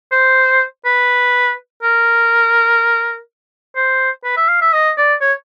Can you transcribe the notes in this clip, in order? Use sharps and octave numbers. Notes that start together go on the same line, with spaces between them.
C5
B4
A#4
C5
B4
E5
F5
E5
D#5
D5
C#5